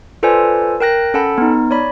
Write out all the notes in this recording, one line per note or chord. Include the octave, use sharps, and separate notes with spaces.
F4 A4 B4 C5 D5 G#5
A#4 G5 F#6 A#6
C#4 A4 F#5 A5 B5
B3 D#4
C#5 D5 B5